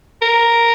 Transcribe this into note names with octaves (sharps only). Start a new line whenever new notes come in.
A#4